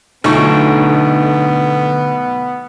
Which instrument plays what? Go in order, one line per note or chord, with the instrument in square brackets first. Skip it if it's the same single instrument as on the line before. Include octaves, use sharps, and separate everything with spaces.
[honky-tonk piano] B1 C#6 [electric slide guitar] D3 A4 [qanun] A3 D#4 F4 [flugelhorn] B3